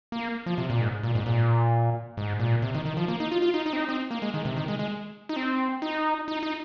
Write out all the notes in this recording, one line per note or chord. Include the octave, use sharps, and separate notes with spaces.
A#3
F3
C3
A#2
G#2
A#2
G#2
A#2
G#2
A#2
C3
D#3
D#3
F3
A#3
D#4
F4
F4
D#4
D#4
C4
D#4
C4
A#3
G#3
D#3
C3
D#3
G#3
G#3
D#4
C4
D#4
D#4
D#4